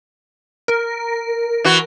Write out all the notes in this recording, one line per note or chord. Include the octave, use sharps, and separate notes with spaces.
A#4
E3 F#4